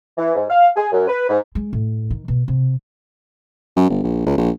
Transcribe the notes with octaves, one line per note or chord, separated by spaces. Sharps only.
E3
G#2
F5
G#4
F#2
B4
G#2
G#3
A2
D#3
B2
C3
F#2
G1
A#1
C#2
A#1